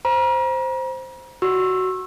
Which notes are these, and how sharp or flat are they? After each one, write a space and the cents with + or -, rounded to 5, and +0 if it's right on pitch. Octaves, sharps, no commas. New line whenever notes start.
C5 +0 A#5 +40
F#4 +10 C#6 -30 E6 +5